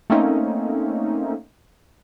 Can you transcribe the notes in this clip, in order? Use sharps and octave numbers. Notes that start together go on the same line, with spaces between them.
A3 A#3 C4 C#4 D#4